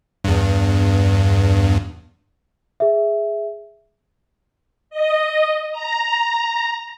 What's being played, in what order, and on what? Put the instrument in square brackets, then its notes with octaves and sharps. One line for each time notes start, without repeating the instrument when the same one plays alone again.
[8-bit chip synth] E2 G2
[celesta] G#4 E5
[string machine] D#5
A#5